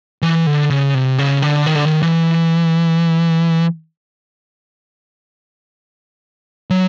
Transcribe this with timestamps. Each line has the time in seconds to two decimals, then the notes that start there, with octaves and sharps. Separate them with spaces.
0.22 E3
0.47 D3
0.70 C#3
0.94 C3
1.19 C#3
1.42 D3
1.66 D#3
1.75 D3
1.85 D#3
2.02 E3
6.70 F#3